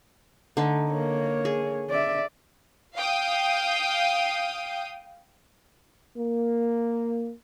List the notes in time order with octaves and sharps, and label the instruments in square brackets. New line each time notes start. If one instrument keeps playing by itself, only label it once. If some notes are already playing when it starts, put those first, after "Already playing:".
[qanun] D3 D#4 [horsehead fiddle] A3
[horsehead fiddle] A#3 C#5
[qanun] G#4
[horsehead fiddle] D5 E5
[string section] F5 G5 D#6
[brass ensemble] A#3